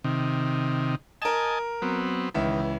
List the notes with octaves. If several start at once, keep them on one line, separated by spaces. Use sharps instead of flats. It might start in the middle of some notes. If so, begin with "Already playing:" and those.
C3 D#3
A#4 D#5 G#5 A5 E7
F#3 B3 C4
C#2 D#3 E3 E5